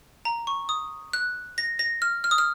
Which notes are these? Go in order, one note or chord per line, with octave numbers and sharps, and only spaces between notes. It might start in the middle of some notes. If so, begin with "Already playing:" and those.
A#5
C#6
D#6
F#6
A#6
A#6
F6
F6
D#6
F6